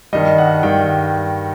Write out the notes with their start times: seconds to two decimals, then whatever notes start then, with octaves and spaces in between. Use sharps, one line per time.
0.13 G2 D#3 G3 D#5
0.38 F#5
0.63 G2 D#3 G3 G5